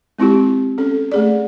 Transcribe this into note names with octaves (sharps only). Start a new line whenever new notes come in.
G#3 C4 E4 F4 G4
C#4 A4
A3 G#4 D5